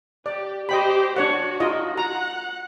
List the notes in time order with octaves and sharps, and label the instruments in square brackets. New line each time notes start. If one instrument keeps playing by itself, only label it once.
[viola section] G4 [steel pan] D5
[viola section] G4 C5 [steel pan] D#5 G5 B5
[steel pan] D4 C#5 F#5 [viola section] F#4
[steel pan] D#4 F4 D#5
[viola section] F#5 [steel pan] A#5